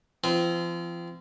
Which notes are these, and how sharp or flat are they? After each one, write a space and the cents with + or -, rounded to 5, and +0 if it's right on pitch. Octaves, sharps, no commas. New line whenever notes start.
F3 -35 C4 -30